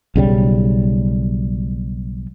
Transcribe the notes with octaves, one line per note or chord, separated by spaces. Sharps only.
B1 C#3 F#3 G3